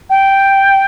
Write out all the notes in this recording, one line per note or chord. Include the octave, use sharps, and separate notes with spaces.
G5